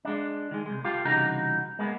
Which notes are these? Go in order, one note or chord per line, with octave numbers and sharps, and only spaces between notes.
G#3 D4
D#3 G#3
C2 G#3
F4 G4 A4 F5
C2 C#3 E3 D#4 F#4 A#5
G#3 A#3 B3